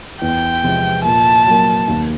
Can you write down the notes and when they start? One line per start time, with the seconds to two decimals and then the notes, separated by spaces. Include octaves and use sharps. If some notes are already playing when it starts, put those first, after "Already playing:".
0.22 E2 G5
0.63 C3 F3 G#3 C4
1.05 A#2 A5
1.46 F#3 A#3
1.88 D#2